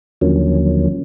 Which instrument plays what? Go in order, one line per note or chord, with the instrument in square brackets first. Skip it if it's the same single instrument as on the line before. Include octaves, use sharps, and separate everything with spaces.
[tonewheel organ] D#2 D3 F3 F#3 A#3 C#4